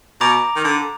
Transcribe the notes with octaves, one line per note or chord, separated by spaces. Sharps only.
B2 A#5 D6
D#3
D3